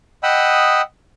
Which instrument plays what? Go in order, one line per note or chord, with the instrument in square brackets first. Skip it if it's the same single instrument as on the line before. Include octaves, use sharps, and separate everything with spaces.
[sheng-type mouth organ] D#5 F#5 G5 B5 D#6 E6